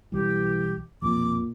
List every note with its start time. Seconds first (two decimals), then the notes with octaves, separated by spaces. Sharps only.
0.12 B1 E3 G3 G4
1.02 B1 F2 A#2 F3 D6